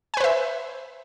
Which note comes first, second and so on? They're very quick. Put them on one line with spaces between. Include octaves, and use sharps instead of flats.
G#5 B4 C5 E5